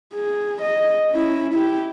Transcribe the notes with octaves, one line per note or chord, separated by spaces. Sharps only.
G#4
D#5
C#4 E4
E4 G4